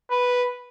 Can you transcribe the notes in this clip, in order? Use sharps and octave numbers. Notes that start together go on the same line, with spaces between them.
B4